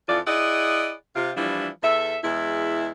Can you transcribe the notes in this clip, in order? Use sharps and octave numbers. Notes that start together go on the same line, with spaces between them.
F2 E3 F3 F4 D5
E4 G#4 D5 D#5 F#5
C3 F4
E3 F3 G3 D4 E4
E2 A4 E5
E2 G#3 E4